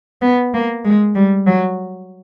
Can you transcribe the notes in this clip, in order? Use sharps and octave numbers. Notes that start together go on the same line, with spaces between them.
B3
A#3
G#3
G3
F#3